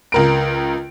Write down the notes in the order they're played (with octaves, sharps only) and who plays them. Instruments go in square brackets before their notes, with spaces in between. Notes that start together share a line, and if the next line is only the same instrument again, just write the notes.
[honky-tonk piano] C#2 A#4 D7